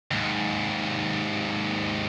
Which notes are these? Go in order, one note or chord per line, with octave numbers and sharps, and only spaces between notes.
D#2 G#2